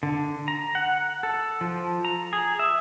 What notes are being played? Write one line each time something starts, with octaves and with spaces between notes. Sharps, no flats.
D3
A#5
F#5
A4
F3
A#5
G#4
E5